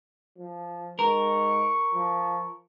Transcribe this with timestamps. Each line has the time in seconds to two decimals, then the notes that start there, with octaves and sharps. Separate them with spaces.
0.38 F3
0.99 G#2 A#4 C#6
1.94 F3